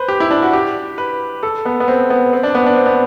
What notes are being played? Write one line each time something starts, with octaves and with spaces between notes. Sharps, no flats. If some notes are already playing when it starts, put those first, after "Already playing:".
Already playing: B4 C5
G4
E4
D4
F#4
G4
B4
A4
B3
B3
C4
B3
C4
D4
B3
D4
C4
B3